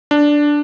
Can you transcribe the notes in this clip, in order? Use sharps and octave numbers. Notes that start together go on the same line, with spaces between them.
D4